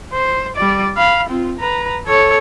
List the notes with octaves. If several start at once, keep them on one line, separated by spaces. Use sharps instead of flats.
C5
G3 D5
F5 B5
C4 F4
B4 A#5
A4 C#5